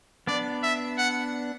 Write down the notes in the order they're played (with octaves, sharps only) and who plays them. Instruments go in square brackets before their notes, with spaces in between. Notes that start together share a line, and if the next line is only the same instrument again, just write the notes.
[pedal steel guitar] B3 D4 [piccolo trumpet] D5
[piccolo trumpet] E5
F#5